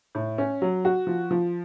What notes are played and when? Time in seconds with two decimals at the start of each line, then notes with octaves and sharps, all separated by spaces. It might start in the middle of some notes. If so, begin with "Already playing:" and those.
0.15 A2
0.38 C#4
0.62 F#3
0.85 F#4
1.07 F3
1.31 F3